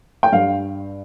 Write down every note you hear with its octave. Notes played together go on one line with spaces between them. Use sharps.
G5
G2 F5